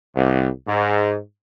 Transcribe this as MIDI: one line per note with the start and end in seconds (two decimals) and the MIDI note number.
0.15 0.47 36
0.68 1.18 44